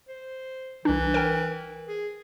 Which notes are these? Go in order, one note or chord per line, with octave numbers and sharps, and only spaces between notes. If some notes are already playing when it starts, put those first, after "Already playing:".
C5
C2 E3 D4
A#4 G5
G#4